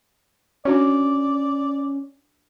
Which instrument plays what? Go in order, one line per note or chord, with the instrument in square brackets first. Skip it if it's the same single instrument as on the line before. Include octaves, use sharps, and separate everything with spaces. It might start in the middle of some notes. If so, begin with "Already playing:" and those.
[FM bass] C#4 [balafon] D4 F#4 C#5 [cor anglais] D5